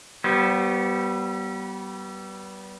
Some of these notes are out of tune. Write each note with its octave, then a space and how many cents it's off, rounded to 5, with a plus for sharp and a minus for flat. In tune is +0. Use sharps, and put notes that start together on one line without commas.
G3 -35 B3 -15 C5 +5